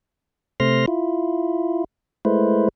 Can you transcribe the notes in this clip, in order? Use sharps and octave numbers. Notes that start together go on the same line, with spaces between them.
C3 A3 C5 C6 F6 A#6
E4 F4
G#3 A3 E4 B4 C5